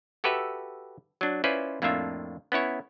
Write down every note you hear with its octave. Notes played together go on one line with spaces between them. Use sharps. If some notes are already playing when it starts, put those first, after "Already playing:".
F#4 G4 A4 B4 E5
F#3 D4
C#4 E4 F4 B4 C5 D5
F2 A2 A#3 D4 F4 E5
B3 C#4 E4 C#5